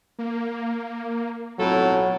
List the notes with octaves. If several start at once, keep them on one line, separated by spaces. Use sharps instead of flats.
A#3
B1 F2 A2 F#3 A4